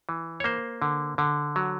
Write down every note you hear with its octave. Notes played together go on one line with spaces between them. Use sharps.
E3
C#5
A#3 C5
D3
D3
F#3